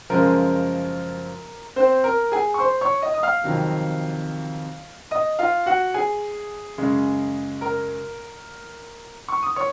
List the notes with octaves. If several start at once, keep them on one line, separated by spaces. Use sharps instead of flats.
F#2 C#3 F3 G#3 A#4
C4 C5
A#4
G#4 G#5
C#6
C5 C6
C#5 C#6
D#5 D#6
D#6
F5 F6
F2 C3 D#3 F#3
D#5 D#6
F4 F5
F#4 F#5
G#4 G#5
F#2 C#3 G#3
A#4 A#5
C#6
D#6
C#5 C#6